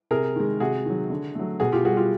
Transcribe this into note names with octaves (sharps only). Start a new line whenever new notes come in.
C3 G#4 A#4
D#3 G#3
C3 F#4 G#4
D#3 F#3
D3
F#3 A3
B2 F#4 G#4
F4 G4
G3 F#4 G#4
F4 G4